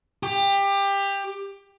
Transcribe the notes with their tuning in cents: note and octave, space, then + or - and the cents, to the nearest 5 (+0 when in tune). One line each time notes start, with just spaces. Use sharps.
G4 +20